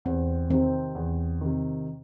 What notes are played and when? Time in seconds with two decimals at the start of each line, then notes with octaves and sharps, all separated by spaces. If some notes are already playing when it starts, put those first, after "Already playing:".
0.05 E2 C4
0.50 C3 D#3 C4
0.95 E2
1.41 C3 D#3